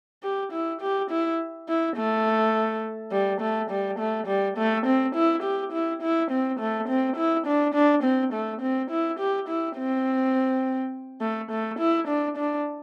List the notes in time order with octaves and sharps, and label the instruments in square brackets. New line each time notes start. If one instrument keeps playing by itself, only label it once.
[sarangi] G4
E4
G4
E4
E4
A3
G3
A3
G3
A3
G3
A3
C4
E4
G4
E4
E4
C4
A3
C4
E4
D4
D4
C4
A3
C4
E4
G4
E4
C4
A3
A3
E4
D4
D4